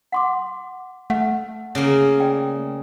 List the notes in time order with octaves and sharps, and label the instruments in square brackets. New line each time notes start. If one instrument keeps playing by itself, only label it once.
[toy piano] F#5 C6 D6
[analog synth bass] A3 [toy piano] B4 F#5
[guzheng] C#3 A#3
[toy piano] D5 G5